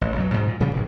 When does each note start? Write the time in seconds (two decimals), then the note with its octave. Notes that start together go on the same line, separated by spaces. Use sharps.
0.01 A1
0.16 B1 F#2 F#3
0.34 G#2 B2
0.47 A#2
0.60 A#2 C#3 F3 G3
0.73 A#1 E2 G#2